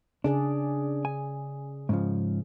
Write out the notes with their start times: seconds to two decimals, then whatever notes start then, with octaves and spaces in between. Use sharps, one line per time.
0.24 C#3 D4 G#4 D5
1.05 G#5
1.89 G#2 C#3 F3